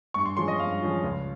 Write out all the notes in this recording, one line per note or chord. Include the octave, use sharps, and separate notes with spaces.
G2 C#6
C6
F3 G#3 C#4 F4 C6
D#5
G2 F5
F3 G#3 C#4 F4
C#2